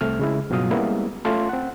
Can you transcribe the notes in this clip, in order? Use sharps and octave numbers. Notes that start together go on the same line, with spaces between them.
C2 A3 C4 F6
C#3 G#3 E4
G2 B2 F#3 F4 F5 D#6
G3 G#3 A#3 B3 C#4 E4
A3 C#4 F4 A5 C6
C4 F#5